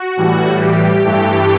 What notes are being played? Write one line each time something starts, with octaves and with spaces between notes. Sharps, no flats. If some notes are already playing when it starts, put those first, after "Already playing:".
Already playing: F#4
A2 E3 G3
G4
G2 E3 A3